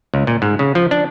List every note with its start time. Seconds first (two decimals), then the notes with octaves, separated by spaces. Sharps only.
0.14 C#2
0.27 A#2
0.42 G#2
0.59 C#3
0.75 F3
0.91 D4